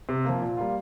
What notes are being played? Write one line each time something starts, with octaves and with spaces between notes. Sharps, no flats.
C3
F3 A#3
A#2
G3 A#3 F4